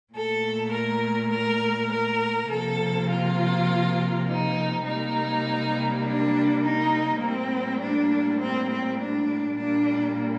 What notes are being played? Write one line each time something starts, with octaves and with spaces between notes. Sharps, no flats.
A#2 A3 A4
A#4
A#4
A#4
C3 F3 A#3 A4
F4
D#4
C3 G3 A#3 D#4
D4
D#4
A2 G3 A#3 C4
D4
C4
C4
D4
A#2 G3 A#3 D4